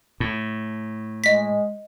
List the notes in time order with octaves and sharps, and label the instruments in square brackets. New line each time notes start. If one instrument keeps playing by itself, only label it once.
[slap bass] A2
[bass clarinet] G#3 [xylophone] D#5 B6